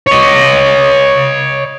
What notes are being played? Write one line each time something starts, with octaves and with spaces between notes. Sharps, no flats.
C#5 D#5